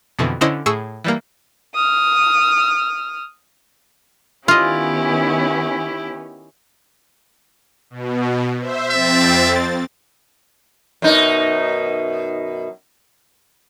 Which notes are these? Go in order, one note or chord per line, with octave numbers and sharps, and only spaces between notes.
F2 B2 D3 E3
D3 C#4 E4 C5 D#5
A2 G#4 C#6 E6
E3 G3 A#3
D#6 F6
D#3 B3 C#4 E4 F4 G4 D#5
B2
C5 E5
F2 C4 E5 A6
F#2 B2 D#4